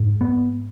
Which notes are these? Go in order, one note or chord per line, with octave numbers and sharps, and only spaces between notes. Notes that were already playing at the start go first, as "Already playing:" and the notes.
Already playing: G#2
B3